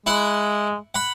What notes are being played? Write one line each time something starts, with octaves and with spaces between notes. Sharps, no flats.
G#3 E4 F#5
F#5 B5